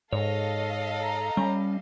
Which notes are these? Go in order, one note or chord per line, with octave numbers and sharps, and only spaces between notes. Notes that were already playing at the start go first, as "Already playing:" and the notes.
G#2 A4 C#5 D#5 F5
A#5
G3 C#4